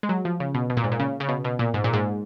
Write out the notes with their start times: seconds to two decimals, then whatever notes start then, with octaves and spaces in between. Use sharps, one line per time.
0.03 G#3
0.09 F#3
0.25 F3
0.40 C#3
0.54 B2
0.70 B2
0.77 A#2
0.84 G#2
0.92 A#2
1.00 C#3
1.20 C#3
1.29 B2
1.45 B2
1.59 A#2
1.74 G#2
1.84 A#2
1.93 G#2